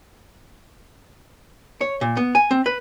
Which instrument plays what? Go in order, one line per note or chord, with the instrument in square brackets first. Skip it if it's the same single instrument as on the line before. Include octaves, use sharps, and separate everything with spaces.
[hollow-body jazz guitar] C#5
A#2
B3
G#5
C4
B4